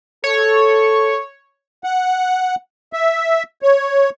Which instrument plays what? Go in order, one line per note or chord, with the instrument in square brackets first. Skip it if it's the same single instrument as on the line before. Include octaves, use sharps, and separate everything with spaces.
[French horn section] A4 [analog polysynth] C#5
[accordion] F#5
E5
C#5